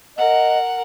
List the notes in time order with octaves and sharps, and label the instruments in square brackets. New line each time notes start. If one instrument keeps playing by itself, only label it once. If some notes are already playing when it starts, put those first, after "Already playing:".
[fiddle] A#4 F#5 [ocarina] D#5